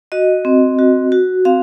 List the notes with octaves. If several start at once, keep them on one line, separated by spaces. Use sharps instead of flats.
F#4 D#5
C4
F#4
F#4
C4 F5